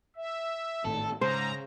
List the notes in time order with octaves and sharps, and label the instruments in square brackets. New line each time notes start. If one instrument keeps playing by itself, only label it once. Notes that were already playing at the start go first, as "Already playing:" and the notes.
[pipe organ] E5
[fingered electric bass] G#1 A2 D#3 [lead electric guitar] A4
[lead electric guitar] G#2 [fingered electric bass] C#3 [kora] C5 [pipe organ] A#5